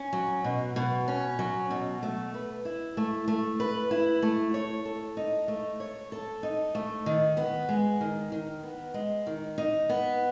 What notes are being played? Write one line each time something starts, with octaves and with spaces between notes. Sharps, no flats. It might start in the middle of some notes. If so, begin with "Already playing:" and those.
Already playing: C#4
F#3
B2
B2
C#4
F#3
B2
A3
B4
E4
A3
A3
B4
E4
A3
C#5
A4
D#4
A3
C#5
A4
D#4
A3
D#3
B3
G#3
D#3
D#3
B3
G#3
D#3
D#4
B3